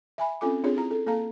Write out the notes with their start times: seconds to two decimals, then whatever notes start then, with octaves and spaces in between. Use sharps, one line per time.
0.18 E5 G#5 B5
0.41 C4 C#4 F4 A4 G#5 D6
0.64 C4 D4 F4 G#4 C#5
0.77 E4 A#5
0.91 A4
1.06 A#3 A4 F5 A#5